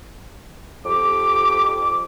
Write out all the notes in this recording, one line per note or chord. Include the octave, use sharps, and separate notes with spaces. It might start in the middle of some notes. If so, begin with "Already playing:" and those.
F2 G4 D6